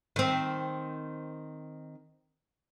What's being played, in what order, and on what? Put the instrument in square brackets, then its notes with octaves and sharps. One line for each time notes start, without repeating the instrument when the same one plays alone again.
[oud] D#3 C4